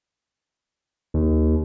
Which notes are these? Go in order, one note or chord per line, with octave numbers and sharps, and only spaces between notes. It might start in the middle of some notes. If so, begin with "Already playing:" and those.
D#2